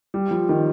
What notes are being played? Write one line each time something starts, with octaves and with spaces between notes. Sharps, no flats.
G3
F3
D#3